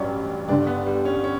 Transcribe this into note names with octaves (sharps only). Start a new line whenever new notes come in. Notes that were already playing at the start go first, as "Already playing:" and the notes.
Already playing: A1 G2 F#3 C#4 D4
G1 G2 D3 D4
B3
G3
C#4
C#4